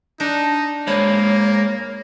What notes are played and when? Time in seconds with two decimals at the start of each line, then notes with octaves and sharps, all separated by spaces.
0.20 D4 D#4
0.87 G#3 A#3 C5 C#5 B5